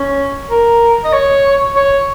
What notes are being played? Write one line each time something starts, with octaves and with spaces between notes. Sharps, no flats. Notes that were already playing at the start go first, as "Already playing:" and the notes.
Already playing: C#4
A#4
D#5
C#5
C#5